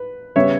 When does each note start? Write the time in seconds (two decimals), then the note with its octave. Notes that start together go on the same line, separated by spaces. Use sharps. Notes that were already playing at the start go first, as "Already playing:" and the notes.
Already playing: B4
0.36 C#3 G3 B3 C#5 E5